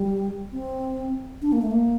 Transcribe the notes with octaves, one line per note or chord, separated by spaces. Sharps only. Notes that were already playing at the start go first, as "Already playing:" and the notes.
Already playing: G3
C4
D4
A#3
A3
A#3